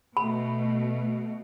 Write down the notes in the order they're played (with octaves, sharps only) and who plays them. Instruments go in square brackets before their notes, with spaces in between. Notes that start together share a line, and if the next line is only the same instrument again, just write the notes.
[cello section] B2 A3 [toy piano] B5